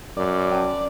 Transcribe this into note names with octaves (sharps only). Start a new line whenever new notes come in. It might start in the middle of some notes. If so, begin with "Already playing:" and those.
F#2 D5
C#4 A5